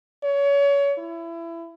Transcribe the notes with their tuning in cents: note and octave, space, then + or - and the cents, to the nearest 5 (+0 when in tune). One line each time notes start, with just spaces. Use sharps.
C#5 +25
E4 +25